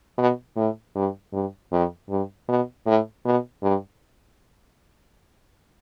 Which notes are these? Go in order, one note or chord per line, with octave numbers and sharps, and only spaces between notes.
B2
A2
G2
G2
F2
G2
B2
A2
B2
G2